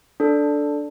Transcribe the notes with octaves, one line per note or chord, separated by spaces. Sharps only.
D4 A4